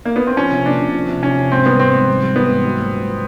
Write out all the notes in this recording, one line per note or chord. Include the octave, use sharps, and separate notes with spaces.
A#3
B3
C4
F3 C#4
C3
A#3 D4
C3
F3
C3
C3 C#4
C3
G#2 C4
G3 B3
G#2 C4
G#2
G3
G3
E3 B3
G#2
F#3
A#3
C#2